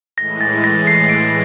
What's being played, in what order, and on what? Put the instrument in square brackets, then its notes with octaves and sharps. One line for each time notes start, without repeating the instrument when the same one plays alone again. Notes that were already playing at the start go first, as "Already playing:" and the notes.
[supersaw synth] A2 E3 G#3 [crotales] A#6
[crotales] A6
A#6
C7
D7